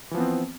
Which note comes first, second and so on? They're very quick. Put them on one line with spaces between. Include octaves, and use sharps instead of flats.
E3 F3 B3 C4